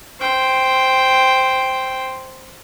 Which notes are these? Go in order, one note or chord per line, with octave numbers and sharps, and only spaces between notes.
C5 G5